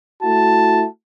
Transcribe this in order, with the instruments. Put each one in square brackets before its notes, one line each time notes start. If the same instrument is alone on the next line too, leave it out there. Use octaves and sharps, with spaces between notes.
[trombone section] A3 E4 F#4 [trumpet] A5